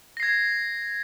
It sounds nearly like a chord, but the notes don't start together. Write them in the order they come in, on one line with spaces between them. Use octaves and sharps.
A#6 C7 G#6